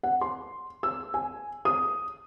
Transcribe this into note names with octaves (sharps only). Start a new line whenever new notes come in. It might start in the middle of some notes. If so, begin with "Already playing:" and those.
F#5
C6
E6
G#5
D#6